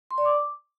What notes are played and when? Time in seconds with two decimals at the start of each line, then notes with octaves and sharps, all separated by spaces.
0.11 C6
0.18 D5
0.25 D6